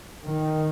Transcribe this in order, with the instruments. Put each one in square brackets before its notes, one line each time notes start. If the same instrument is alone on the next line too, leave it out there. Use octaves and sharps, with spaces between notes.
[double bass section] D#3